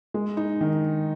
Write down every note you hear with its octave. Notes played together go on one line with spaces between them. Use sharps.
G#3
D#4
D#3